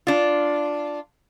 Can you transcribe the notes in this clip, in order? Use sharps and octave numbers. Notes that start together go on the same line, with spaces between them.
D4 F4